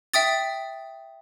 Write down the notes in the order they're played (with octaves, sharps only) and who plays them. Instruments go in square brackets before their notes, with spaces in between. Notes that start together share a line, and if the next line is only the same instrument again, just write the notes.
[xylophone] E5 G5 D#6 A6